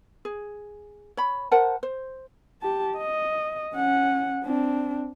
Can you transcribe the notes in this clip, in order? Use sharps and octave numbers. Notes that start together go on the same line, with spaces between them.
G#4
C#5 B5
A#4 C5 F#5 A5
C5
G4 A5
D#5
C#4 F#5
C4 D4